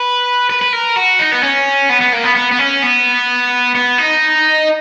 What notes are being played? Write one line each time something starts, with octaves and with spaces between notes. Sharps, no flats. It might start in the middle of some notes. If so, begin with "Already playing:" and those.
Already playing: B4
B4
B4
A#4
F#4
D#4
B3
C#4
B3
B3
A#3
B3
B3
B3
C#4
B3
B3
D#4